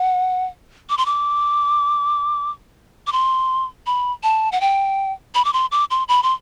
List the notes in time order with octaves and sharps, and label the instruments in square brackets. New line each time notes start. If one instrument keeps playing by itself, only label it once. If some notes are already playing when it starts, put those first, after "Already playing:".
Already playing: [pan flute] F#5
D6
C6
D6
D6
C6
B5
A5
F#5
G5
B5
D6
C6
D6
C6
B5
C6